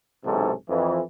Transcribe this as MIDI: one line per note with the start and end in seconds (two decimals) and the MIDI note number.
0.25 0.52 35
0.25 0.52 44
0.25 0.52 48
0.25 0.52 52
0.25 0.52 61
0.25 0.52 69
0.69 1.00 41
0.69 1.00 52